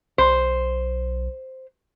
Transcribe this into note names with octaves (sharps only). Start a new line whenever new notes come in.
B1 C5